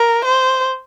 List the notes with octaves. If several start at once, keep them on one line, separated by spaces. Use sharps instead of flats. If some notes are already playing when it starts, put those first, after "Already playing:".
Already playing: A#4
C5